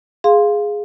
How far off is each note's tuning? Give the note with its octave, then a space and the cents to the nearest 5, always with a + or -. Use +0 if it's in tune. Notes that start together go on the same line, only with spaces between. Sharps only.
G#4 +0 F5 +0 C6 +0